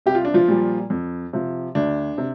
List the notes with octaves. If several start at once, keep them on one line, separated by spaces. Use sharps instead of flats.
C2 G4
F4
D4
F3 F4
A#2 G3
F2
C3 F3
D2 D4
C3